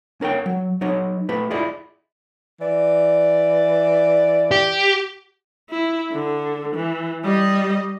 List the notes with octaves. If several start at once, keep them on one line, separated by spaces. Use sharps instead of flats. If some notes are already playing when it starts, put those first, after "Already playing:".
C#4 A#4 C#5 G5
F#3
F#3 D#4 C#5 D#5
A3 G4 B4
E4 F4 G#4 D5 D#5
E3 D5
G4
E4
D3
E3
G3 D#5